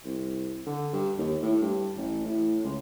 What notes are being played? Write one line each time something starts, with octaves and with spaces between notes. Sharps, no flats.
C2
D3
G2
D#2
A2
G2
A1
A2
C#2